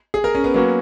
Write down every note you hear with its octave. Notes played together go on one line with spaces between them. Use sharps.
G#4
A#4
C#4
B3
F#3 A#3 B3 C#4 F#4